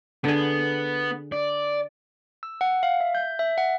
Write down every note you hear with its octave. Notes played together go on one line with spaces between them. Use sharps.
D3 B3 G#4
D5
E6
F#5
F5
E5
G6
E5
F#5